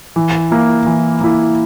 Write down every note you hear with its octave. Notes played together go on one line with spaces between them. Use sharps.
E3
A#3 E4
E3
A#3 E4